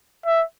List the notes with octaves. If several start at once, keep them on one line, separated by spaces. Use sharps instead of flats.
E5